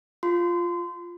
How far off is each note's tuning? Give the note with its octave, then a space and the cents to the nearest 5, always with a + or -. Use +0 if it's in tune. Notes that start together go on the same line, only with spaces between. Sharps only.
F4 +0 C6 -25